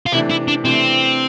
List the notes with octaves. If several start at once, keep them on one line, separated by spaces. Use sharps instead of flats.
F4
C3 E3 A3 D4 E4
E4
D4
C3 E3 A3 C4 D4